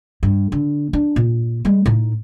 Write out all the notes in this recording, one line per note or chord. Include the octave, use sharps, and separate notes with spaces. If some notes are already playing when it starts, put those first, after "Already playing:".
G2
D3
D4
A#2
G3 G#3
A2 D#4